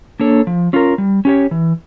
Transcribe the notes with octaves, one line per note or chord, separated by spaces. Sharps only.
A#3 D4 A4 C#5
F3
C#4 F4 A#4
G3
C#4 G4 C#5
E3